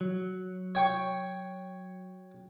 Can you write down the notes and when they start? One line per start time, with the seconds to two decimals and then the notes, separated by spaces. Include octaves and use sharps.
0.01 F#3
0.75 C#5 G5 C#6